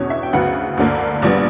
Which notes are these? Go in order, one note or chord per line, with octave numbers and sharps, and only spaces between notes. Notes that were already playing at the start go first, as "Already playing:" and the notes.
Already playing: E2 B2 F#3 C#4 C#5
E5
G5
D2 C#3 F#3 B3 F#5
D2 D3 A#3
A#1 A#2 G3 B3 D5